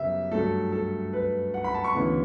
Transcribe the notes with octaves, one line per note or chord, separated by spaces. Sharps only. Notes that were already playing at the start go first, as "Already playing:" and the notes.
Already playing: F#2 C#3 G3 B3 E5
G2 F#3 A3 A4
A4
B4
F#5
B5
A5
C#6
D2 C#3 E3 B3